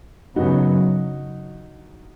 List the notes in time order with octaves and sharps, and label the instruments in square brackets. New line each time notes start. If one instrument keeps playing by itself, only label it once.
[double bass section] F#2 C#3 F#3 B3 [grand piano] D#4 F#4